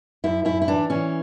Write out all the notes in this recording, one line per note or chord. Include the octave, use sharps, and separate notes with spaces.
F#2 E4
F#2 E4
E4
E3 D4
E3 C#4